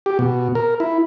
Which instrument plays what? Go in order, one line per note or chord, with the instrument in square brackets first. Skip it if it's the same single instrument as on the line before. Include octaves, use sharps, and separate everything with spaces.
[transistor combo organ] G4
B2
A#4
E4